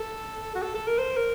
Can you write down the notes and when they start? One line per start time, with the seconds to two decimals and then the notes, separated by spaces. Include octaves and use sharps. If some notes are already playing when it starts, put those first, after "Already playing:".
Already playing: A4
0.56 F#4
0.63 A4
0.75 A4
0.87 A#4
0.99 C5
1.17 A#4